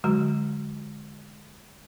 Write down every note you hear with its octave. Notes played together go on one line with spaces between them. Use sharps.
D3 F#3 G#3 F#4 A#5